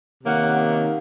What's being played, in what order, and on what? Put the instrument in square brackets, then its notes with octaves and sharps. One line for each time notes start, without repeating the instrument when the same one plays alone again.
[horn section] C3 D#3 A#3 C#4 F#5